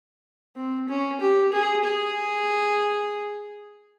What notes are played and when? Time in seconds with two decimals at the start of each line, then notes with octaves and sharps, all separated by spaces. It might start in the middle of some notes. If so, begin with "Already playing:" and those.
0.56 C4
0.88 C#4
1.20 G4
1.52 G#4
1.84 G#4